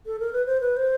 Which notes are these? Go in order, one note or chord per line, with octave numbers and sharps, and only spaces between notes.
A4
A#4
B4
C5
B4
C5